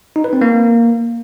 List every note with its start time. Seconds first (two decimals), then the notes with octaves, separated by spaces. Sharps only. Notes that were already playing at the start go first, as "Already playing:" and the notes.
0.16 D#4
0.24 B4
0.33 C4
0.41 A#3